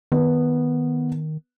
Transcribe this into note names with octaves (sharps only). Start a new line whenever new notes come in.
D#3 B3